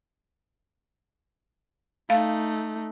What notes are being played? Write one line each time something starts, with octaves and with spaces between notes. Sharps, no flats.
A3 D#4 F5